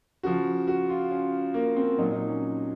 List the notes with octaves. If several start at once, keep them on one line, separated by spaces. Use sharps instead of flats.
C#3 F3 F#4
F#4
F4
C#4
A#3
C4
A#2 F#3 D#4
D#4
C#4